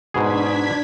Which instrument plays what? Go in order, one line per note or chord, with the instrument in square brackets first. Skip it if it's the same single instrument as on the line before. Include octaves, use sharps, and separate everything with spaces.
[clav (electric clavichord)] G#2 B2 G#4 [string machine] D4 G#6 B6